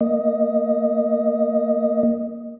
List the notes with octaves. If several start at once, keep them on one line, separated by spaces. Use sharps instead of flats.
A#3 D#5